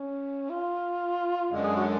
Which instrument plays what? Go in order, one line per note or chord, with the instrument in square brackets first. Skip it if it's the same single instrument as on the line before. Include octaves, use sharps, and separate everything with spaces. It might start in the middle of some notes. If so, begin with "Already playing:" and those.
Already playing: [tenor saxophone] C#4
F4
[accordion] F#2 D3 G#3
[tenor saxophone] G#4
F#4